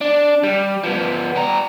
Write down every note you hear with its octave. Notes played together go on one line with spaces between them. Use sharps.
D4
G3
F3 B3
G3 A#5